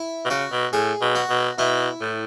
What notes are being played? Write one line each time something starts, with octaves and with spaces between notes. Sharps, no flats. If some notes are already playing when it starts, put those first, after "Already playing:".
Already playing: E4
B2
C#3 F#4
B2
A2 G#4
B2
F#4
B2
B2 E4
A2